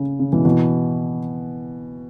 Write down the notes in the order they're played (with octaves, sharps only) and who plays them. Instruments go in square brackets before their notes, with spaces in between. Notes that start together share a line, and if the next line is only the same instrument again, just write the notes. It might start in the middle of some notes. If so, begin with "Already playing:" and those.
Already playing: [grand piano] C#3
C#3
B2 E3
B2 E3